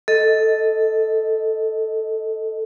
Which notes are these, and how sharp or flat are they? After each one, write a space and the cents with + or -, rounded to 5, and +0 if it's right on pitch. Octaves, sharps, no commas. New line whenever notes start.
A4 +0 D#5 +0